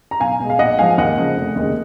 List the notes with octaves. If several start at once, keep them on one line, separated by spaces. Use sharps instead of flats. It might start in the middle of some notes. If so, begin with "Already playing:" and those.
A#5
B1 F5 G#5
B2 G#3
F5
A#1 D#5 F#5
G#2 F3 G#3 F5 G#5
D#2 D#5 F#5
C#3 F3 G#3
F1
D#2 C#3 G#3